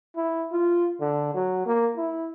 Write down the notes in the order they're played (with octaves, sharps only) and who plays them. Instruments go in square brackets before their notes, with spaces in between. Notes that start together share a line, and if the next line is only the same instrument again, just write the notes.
[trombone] E4
F4
D3
F#3
A#3
E4